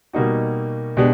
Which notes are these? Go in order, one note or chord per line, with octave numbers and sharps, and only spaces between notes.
B2 G3 A#3 D#4 F#4
B2 G#3 B3 D4 G4